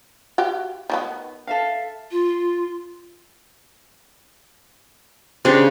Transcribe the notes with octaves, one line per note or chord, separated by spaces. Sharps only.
F#4 G4 F5
D#3 A#3 B3
A4 E5 F5
F4
C#3 D4 G4 C5